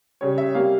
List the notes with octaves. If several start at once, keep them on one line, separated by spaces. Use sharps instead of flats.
C#3 G3 C#4 C#5
E5
C3 G3 A#3 F5